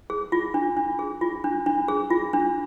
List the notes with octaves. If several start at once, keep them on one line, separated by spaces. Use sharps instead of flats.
G#4
F4
D4
D4
G#4
F4
D4
D4
G#4
F4
D4